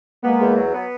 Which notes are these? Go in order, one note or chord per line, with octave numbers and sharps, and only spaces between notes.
G#3 A#3 B3
E2
F#3
B3